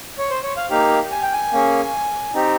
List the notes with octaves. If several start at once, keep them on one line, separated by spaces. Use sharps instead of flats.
C#5
C5
C#5
F5
A#3 D#4 G4 F5
G#5
G5
G#5
A#3 C#4 G#4
C4 D#4 G4